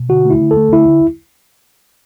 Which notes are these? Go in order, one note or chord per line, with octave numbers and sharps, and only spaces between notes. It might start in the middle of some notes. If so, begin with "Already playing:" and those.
Already playing: B2
D3 F#4
A3 E4
D3
A4
A3
D3 E4
D3